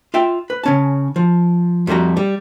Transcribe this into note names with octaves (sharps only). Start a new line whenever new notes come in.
F4 E5 G5
B4
C#3 C#4 A5
F3
F2 G3 A3 F#4 A#5
G3